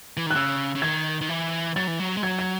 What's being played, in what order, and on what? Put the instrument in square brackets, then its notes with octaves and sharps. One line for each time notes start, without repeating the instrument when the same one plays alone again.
[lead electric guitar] E3
D#3
[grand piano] F#6
[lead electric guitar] C#3 [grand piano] E6
[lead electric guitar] C#3
[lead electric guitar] D#3 [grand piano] G#6
[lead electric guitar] D#3
E3
[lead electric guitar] F#3 [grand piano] A6
[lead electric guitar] E3
F#3
G#3
[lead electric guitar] F#3 [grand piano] G#6
[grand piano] G#6